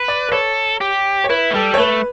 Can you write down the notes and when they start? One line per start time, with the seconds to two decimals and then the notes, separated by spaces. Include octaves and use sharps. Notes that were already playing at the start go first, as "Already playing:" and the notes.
Already playing: B4
0.08 D5
0.29 B4
0.32 A4 C#5
0.81 G4
1.24 C#5
1.29 E4 B4
1.51 A3
1.54 G3 A4
1.74 C#5
1.78 A3 B4